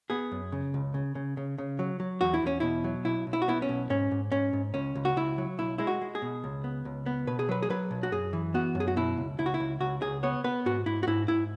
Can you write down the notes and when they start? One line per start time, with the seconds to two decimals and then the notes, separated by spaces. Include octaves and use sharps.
0.10 B3 G#4
0.32 F#2
0.52 C#3
0.74 C#2
0.94 C#3
1.15 C#3
1.37 C#3
1.58 C#3
1.79 F#3
2.00 F#3
2.21 E2 F#4
2.34 E4
2.42 E2 C#4
2.60 B2 E4
2.84 F#3
3.05 B1 E4
3.27 B1
3.33 E4
3.42 F#4
3.48 B3 E4
3.62 C#4
3.69 B1
3.90 G#2 C#4
4.11 G#2
4.32 G#2 C#4
4.53 G#2
4.74 C#2 C#4
4.95 C#2
5.05 F#4
5.16 C#2 E4
5.38 F#3
5.58 B1 E4
5.78 G#3 E4
5.87 F#4
6.02 G#3
6.15 G#4
6.22 B2
6.44 C#2
6.64 B3
6.85 C#2
7.06 B3
7.27 B2 B4
7.39 G#4
7.49 F#3 B4
7.63 G#4
7.70 F#3 B4
7.91 B1
8.03 F#4
8.12 F#2 G#4
8.33 E3
8.54 B3 F#4
8.75 F#2
8.80 G#4
8.88 F#4
8.96 B2 E4
9.17 C#2
9.38 C#2 E4
9.46 F#4
9.54 E4
9.60 C#2
9.80 C#2 F#4
10.02 C#2 G#4
10.23 B3 C#5
10.44 B3 B4
10.66 G#2 F#4
10.86 G#2 E4
11.03 F#4
11.07 G#2 E4
11.28 G#2 E4